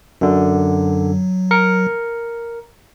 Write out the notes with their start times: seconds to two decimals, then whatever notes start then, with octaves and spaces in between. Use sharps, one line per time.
0.21 F#2 D3 F#3
1.51 A#4 C#7